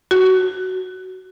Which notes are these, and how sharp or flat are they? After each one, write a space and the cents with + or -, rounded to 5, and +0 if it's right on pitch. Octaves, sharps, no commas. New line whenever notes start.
F#4 +10